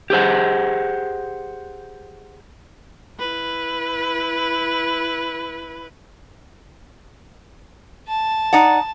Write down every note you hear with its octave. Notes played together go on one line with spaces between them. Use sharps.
G4 G#4 C5 F#5
E4 B4
A5
D#4 D5 F#5